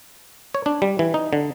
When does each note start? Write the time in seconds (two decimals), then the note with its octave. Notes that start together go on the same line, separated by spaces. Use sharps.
0.55 C#5
0.66 D4
0.82 G3
0.99 E3
1.14 D#4
1.33 D3